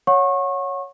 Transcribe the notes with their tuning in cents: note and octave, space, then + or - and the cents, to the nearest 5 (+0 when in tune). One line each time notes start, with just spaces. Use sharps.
C#5 +0 F#5 -25 C#6 -30